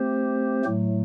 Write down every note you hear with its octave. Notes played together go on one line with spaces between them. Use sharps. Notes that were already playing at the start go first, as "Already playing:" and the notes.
Already playing: A3 C4 G4 C5
A2 F#3 A3